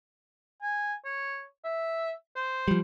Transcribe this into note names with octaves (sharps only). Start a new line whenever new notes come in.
G#5
C#5
E5
C5
F3 G3